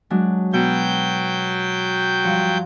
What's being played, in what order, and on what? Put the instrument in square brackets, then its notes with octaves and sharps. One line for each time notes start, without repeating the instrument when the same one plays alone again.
[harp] F#3 G#3 D4
[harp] B2 [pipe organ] F#3 G5 G6
[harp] G2 F3 F#5